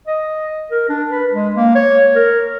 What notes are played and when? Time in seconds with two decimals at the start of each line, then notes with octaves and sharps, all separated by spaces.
0.07 D#5
0.71 A#4
0.89 D4
1.10 B4
1.33 G#3
1.56 A#3
1.75 C#5
2.15 A#4